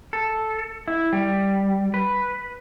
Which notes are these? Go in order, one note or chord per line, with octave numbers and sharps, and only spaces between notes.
A4
E4
G3
B4